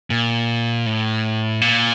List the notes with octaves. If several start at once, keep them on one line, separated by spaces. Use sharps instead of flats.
A#2
A2
A#2